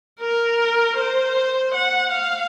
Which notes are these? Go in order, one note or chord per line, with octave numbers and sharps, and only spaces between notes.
A#4
C5
F#5
F5